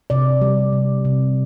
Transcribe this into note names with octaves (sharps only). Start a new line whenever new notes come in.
C3 D5
G3
C3
C3